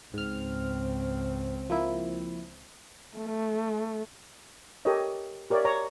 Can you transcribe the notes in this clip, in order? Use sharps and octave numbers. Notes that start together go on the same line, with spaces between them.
C#2 G#2 C4 F6
F3 A#3 E4
A3
G4 A4 A#4 C#5 D#5
G4 A#4 C#5 D5 E5
C#5 A#5